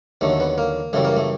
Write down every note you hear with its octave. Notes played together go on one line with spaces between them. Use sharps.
D#2 D3 F#3 A3
B3
A#3
F#2 C#3 E3 G3 A3
A#3
A3